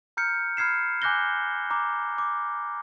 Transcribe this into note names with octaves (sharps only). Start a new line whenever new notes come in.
A#5 F6 G6 C#7
B5 F6 G#6 C7 E7
G#5 D6 F#6 G6 A#6 G7
A#5 D6
D6